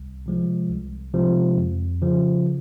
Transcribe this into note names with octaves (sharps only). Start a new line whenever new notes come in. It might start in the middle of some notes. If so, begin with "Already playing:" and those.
Already playing: C2
C3 F3 G#3
C2
C3 F3 G#3
F2
C#3 F3